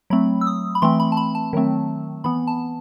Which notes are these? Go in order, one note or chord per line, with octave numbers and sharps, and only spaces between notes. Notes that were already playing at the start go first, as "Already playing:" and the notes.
F#3 A3 C4 B5
E6
D#6
B5
E3 A3 C4 C6
B5
A5
B5
A5
D#3 F#3 A3 C4
E3 B3 B5
A5